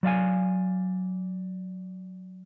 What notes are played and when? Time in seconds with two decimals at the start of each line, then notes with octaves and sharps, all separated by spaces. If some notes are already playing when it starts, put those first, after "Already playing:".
0.03 F#3 D5 F5 G#5